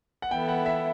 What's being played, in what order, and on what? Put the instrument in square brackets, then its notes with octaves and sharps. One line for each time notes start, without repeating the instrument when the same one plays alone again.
[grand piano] F#5
[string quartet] E3 B3 E4 A4 [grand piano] G5
[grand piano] F#5
E5